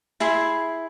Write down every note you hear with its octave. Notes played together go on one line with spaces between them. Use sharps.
E4 G#4 E5 C6